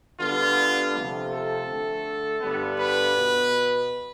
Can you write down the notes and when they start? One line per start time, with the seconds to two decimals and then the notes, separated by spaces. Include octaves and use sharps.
0.19 D3 G3 B3 F4
0.94 C3 F3 A3
1.30 A4
1.67 D3 A3
2.41 G2 D3 G3 B3
2.78 B4
3.15 B2 B3